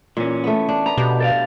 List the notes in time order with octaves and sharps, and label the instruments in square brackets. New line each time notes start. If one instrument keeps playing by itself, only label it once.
[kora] A#2 [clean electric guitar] E3 C#4
[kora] A3 B3
D4
[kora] B3 [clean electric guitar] A#5
[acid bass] B2 [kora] G4
[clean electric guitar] A4 D5 F5